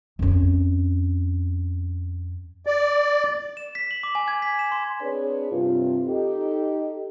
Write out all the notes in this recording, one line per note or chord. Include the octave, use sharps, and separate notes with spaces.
F2 C#4
D5
E7
B6
F#7
D6
G#5
G#6
B6
E7
C6
C4 D4 G#4 B4 C#5 D5
G2 C3 C4 F4
D#4 G4 A4